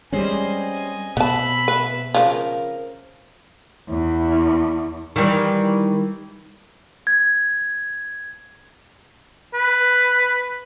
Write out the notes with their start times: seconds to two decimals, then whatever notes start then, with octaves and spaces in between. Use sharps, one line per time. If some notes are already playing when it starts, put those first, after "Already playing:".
0.12 G3 G#3 A#3 C4 C#4 C5 D#5 G#5
1.17 B2 B3 E5 A5 B5
1.68 B4
2.14 C#3 F3 A#4
3.89 E2
5.16 D#3 E3 G3
7.07 G#6
9.54 B4